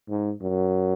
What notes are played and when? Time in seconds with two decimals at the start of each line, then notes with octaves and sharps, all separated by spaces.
0.09 G#2
0.42 F#2